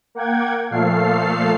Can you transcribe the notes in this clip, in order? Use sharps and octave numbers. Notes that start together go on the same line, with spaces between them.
A#3 F#5 G5 G#6
A#2 F3 A3 A4 F5 C7